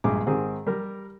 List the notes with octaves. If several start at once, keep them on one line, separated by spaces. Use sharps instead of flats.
A#1 G2 G#3 D6
G#2 D#3 C4 G#4
G3 A#4